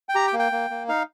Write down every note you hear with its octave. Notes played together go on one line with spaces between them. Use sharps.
G5
G4 A#5
G5
A#3
G5
A#3
A#3
D#4 F5